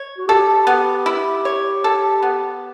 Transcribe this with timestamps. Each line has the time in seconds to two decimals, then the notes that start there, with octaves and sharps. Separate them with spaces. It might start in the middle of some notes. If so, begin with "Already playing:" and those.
Already playing: C#5
0.18 F#4
0.28 G4 A4
0.67 B3
1.06 E4
1.45 C#5
1.84 A4
2.23 B3